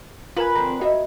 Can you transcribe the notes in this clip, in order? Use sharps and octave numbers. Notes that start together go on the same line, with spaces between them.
F4 A#4 B4 G#5
D3 F3 C4 A#5
F#4 C#5 D#5 E5